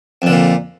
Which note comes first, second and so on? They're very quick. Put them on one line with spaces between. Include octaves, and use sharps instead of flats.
F2 D3 A#2